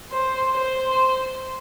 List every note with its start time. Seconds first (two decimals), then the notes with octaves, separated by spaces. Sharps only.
0.11 C5
0.53 C5